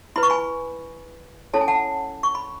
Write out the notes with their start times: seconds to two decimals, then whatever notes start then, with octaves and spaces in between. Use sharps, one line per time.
0.16 E4 B4 B5
0.23 C#6
0.30 G#5 B5
1.54 C#4 E4 A4 C#5 A5
1.61 G#5
1.68 F#5 A5
2.23 C#6
2.35 B5